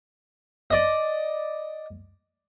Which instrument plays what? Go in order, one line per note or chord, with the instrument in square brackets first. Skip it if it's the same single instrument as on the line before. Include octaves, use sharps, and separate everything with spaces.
[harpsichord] D5 D#5